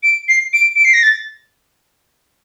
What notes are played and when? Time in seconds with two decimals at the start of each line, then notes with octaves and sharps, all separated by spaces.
0.03 D7
0.28 C7
0.53 D7
0.76 D7
0.85 C7
0.94 A#6
1.03 A6